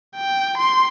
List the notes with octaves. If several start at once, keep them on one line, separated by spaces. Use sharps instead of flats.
G5
C6